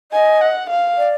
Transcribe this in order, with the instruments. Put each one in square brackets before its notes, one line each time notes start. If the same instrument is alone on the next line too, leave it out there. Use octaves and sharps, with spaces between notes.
[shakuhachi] D#5 [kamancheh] G#5
[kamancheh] F#5
F5
[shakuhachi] D5